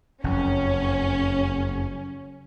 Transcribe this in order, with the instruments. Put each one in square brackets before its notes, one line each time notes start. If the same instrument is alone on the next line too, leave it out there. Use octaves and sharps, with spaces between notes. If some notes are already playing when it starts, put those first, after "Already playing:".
[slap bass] F#1 F2 [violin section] C#4